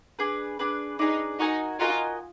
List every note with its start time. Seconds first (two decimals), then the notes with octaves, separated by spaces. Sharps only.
0.19 D4 G#4 B4
0.59 D4 G#4 B4
0.99 D4 D#4 G#4 B4
1.40 D#4 F#4 A#4 D#5 G#5
1.80 F4 F#4 A#4 D#5 G#5